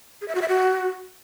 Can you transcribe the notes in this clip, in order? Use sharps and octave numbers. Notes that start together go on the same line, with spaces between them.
G#4
E5
F#4
E5
F#4